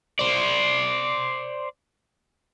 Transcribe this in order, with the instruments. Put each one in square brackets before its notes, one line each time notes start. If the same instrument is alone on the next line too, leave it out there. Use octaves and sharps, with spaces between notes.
[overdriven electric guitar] C5 D5